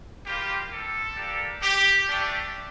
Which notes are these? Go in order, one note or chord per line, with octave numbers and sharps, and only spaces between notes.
G3 A#3 F4 G4
A4
A#3 D4 G4
G4
A3 D4 G4